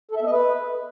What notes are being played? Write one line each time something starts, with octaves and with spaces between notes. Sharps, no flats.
A4
E5
B3
D#5
B4